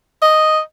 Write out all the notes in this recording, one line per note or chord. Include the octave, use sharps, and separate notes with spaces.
D#5